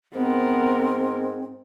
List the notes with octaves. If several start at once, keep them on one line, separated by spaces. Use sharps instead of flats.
G#2 B3 C4 A#4